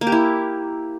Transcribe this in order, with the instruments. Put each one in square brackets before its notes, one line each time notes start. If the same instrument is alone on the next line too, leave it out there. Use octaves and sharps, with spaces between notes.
[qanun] A#3
G4
E4